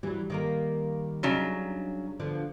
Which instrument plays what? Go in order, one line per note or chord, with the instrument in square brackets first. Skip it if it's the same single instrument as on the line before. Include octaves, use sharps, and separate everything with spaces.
[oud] E3 F#3 [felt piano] G3
[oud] D#3 A#3 A#4
[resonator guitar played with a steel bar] C#3 F#3 [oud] D4 D#4
[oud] D3 F3 B3